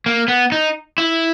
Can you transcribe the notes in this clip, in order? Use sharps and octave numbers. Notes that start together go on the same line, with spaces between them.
A#3
B3
D#4
E4